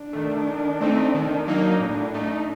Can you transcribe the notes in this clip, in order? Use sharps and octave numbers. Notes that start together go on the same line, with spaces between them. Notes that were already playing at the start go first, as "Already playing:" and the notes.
Already playing: D4
D#3 A3
D#3
A3 C4 D#4
D#3
F#3 A#3 D#4
A2 D4
A3 D#4